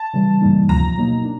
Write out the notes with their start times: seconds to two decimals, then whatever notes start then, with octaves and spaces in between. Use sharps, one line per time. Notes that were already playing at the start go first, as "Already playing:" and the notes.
Already playing: A5
0.14 C#3 E3 G3
0.41 G2 E3 G3 A#3 D#4
0.69 D2 C3 F3 A#5
0.97 B2 F#3 A#3 D#4
1.24 D4